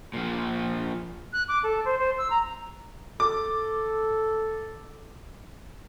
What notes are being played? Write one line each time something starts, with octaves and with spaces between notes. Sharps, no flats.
A#2 F3
F#6
D6
A4
C5
C5
E6
A#5
A4 D6